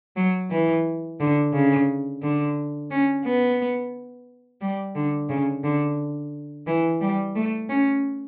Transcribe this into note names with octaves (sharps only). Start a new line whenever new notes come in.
F#3
E3
D3
C#3
D3
C#4
B3
G3
D3
C#3
D3
E3
G3
A3
C#4